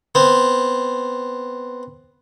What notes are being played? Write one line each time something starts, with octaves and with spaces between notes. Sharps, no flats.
B3 C4